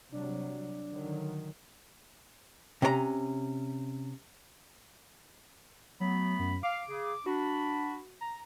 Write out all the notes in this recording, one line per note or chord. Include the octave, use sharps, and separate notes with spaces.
C3 F#3 G3 D4
D3 D#3 F#3
C3 C#4 C#5 A#5
F#3 A3 B3 B5
F#2
F5 D6
C#3 G#4
D4 F#4 B5
A#5